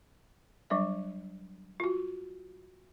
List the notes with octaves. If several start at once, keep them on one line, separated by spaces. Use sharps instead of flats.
F#3 G3 D4 E5
F4 F#4